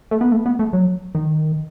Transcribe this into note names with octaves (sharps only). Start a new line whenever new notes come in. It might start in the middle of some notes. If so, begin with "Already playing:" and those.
A3
B3
A3
B3
A3
F#3
D#3